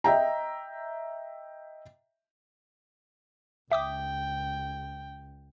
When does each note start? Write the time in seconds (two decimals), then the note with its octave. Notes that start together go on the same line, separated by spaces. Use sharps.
0.04 D#5 E5 G5 A#5
3.72 C#2 E5 G5 D6 D#6